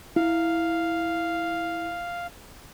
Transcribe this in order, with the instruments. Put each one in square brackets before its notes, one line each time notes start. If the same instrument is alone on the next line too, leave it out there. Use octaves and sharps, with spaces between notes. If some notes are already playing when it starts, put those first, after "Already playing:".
[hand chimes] E4 [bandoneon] F5